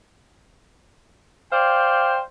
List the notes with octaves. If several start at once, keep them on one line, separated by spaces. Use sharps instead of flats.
C5 D5 F5 G5